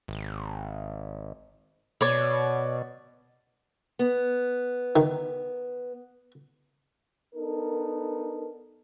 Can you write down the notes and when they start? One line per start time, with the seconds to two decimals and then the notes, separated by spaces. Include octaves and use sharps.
0.08 G#1
2.01 B2 C#5 D5
3.99 B3
4.96 D#3
7.35 B3 D4 D#4 A4 A#4